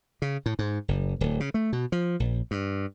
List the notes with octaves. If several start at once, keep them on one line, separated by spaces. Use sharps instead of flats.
C#3
A2
G#2
F#1
D1
C#3
A3
B2
F3
A#1
G2